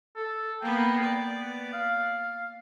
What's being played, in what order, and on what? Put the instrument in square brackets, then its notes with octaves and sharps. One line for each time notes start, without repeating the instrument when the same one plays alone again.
[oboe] A4
[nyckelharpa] A#3 B3 [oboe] G5
[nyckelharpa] D5
[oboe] B3
F5